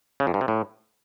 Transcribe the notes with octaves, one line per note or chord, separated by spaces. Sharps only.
C#3
F2
G2
C3
A2